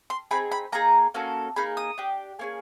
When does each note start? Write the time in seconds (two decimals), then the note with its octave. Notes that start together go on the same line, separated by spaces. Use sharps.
0.10 C6
0.31 C4 D#4 G#4 B5
0.52 B5
0.72 A#3 D#4 G#4 A#5
1.14 A#3 C#4 F#4 A4
1.56 A#3 D#4 G#4 B5
1.77 D#6
1.98 D4 G4
2.39 A#3 C#4 F4 G#4